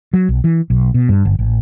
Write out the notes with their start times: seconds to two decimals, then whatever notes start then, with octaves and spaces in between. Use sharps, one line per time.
0.14 F#3
0.29 B1
0.44 E3
0.70 B1
0.94 B2
1.09 G2
1.25 G1
1.39 A1